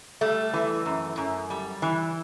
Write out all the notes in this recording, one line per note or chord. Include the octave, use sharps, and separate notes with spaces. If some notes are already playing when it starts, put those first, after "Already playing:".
G3 A3
E3
F#2
F#2
G3
E3